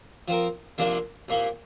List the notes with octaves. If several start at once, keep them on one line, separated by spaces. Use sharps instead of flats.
F3 C4 A#4
C2 C3 F3 A#3 D4
C2 A#2 A#3